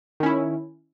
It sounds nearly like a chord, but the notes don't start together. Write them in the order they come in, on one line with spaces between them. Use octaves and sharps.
D#3 C#4 E4